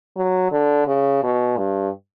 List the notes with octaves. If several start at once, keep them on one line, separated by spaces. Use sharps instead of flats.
F#3
D3
C#3
B2
G2